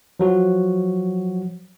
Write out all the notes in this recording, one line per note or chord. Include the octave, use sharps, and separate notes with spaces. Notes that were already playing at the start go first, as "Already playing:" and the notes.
F3 F#3 F#4